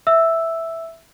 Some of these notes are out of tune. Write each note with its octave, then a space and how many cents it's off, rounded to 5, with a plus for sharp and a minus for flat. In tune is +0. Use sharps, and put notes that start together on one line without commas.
E5 +0 E6 +0